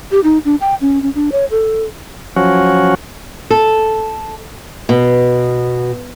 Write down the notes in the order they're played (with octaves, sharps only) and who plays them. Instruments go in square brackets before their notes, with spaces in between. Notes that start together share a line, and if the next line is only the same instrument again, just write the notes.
[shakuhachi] G4
D#4
D4
G5
C#4
C#4
D4
C#5
A4
[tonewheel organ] F3 F#3 C#4 F#4
[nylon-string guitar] A4
B2